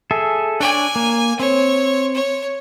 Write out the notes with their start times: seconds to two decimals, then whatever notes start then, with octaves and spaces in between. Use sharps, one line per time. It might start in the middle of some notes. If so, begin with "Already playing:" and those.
0.11 G#4 A4 E5
0.60 D4 C#5 D5 G#5
0.96 A#3
1.40 C4 C#5
2.15 C#5